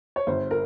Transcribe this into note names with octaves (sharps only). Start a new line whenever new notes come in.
C#5
G1 C5
A#4